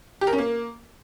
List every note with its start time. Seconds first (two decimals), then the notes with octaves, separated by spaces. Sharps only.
0.21 G4
0.27 A#4
0.33 C#4
0.38 A#3